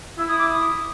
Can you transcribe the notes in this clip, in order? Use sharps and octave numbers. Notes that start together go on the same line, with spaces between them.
E4 E6
D#6
D6
D#6